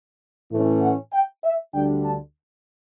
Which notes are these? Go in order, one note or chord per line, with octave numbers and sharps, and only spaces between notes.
A2 E3 A3 C#4
F#5
G5
E5
D2 D3 G3 D4 G5
A5